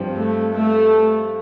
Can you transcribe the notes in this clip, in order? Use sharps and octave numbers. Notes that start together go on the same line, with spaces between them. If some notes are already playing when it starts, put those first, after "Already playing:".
Already playing: G2 F3 C4 G4
A3
A3